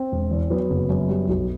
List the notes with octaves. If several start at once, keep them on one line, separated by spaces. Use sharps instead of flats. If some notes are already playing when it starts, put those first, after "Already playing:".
Already playing: C4
E1
E2
F#3 B3
F#1
F#2
G3
B1